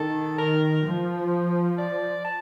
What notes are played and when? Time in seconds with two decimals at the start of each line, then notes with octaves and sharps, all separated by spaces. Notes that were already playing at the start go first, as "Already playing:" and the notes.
Already playing: D#3 A4
0.38 A#4
0.85 F3
1.78 D5
2.25 A5